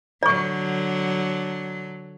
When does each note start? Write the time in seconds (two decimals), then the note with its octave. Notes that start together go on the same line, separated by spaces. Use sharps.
0.23 D3 F#3 D5 C#6